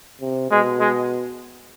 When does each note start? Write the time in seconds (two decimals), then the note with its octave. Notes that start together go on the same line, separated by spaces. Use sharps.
0.21 C3
0.50 B2 G#3
0.80 G#3